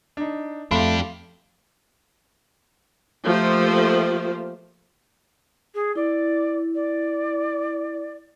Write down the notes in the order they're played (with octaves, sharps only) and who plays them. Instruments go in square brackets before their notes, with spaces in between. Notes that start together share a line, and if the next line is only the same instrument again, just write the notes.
[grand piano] D4 D#4
[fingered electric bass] F2 [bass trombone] A3 [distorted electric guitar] D4 G4 [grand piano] F5 B5 C6
[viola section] F3 A3 A#3 F4 G4 C5
[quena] G#4
[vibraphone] E4 [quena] D5
[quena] D5